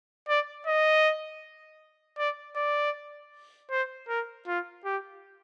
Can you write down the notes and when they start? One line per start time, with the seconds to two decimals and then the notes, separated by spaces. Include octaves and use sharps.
0.29 D5
0.67 D#5
2.18 D5
2.56 D5
3.71 C5
4.09 A#4
4.48 F4
4.85 G4